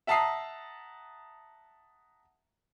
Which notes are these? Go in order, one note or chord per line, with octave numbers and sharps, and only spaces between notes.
E5 F#5 A5 A#5 D#6 C7